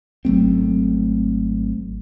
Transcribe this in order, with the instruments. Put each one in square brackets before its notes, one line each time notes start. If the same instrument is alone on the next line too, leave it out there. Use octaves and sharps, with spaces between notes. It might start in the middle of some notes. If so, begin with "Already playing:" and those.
[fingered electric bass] G#1 F#3 A3 C4